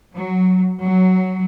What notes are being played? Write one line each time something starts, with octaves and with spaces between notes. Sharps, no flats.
F#3
F#3